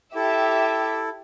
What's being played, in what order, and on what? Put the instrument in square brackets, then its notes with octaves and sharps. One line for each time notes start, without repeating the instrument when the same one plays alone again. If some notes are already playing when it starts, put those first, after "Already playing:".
[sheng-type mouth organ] E4 A4 [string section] G4 E5